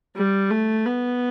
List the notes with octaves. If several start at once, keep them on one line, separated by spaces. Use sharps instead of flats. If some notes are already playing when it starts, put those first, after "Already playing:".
G3
A3
B3